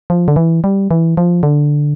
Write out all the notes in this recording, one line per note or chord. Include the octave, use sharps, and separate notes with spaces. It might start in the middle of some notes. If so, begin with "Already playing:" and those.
F3
D3
E3
G3
E3
F3
D3